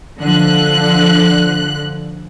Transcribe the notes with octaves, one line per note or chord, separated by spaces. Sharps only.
D3 F3 F#6